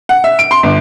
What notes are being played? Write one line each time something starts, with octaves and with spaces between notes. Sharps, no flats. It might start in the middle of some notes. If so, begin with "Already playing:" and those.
F#5
E5
D7
C6
G1